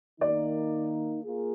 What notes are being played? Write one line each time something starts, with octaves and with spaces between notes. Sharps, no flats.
D#3 A#3 D#4 D5
A#3 F4 G#4